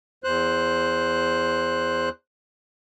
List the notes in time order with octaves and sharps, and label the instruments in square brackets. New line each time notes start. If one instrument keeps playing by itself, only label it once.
[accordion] E2 C5 F#6